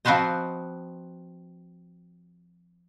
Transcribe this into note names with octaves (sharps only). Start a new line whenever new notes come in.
F3 C4 F#4 B4 C5 D#5